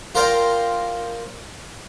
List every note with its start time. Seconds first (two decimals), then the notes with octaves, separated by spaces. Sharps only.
0.15 F4 A#4 C5 D5 F5 G5